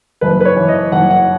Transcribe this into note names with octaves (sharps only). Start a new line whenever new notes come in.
F#1 B4
B4
C#5
E3
D#5
F#1 F#5
F#5